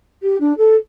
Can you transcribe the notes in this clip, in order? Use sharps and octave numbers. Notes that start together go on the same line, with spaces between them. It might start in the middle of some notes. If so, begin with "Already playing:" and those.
G4
D4
A4